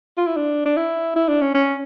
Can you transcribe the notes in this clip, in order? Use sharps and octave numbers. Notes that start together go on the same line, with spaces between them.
F4
E4
D4
D4
E4
E4
D4
C#4
C#4